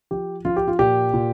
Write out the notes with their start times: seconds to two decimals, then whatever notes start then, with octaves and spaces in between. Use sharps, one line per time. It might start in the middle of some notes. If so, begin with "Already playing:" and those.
0.11 F3 G4
0.45 F3 F4
0.56 G4
0.67 F4
0.79 A#2 G4
1.14 A#2